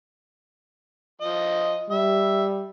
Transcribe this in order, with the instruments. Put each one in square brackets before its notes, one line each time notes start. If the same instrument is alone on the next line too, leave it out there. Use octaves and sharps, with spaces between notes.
[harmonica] F3 D#5
[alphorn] G3 [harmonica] E5